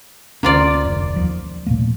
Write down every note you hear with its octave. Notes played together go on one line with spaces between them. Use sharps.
D2 A#3 C#4 F4 D5
F1
D#2 F3
A#2 A3 A#3